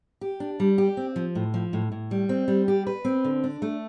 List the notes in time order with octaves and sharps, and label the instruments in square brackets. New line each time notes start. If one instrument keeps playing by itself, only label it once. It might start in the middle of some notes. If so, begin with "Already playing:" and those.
[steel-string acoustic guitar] G4
D4
G3
G4
C4
F3
A2
F3
A2
A2
G3
C4
G3
G4
B4
C4
D3
D4
A3